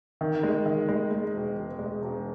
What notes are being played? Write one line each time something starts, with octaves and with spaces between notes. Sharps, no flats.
D#3
G#3
D#3
G#3
G#3
E1
E1
G#3
E1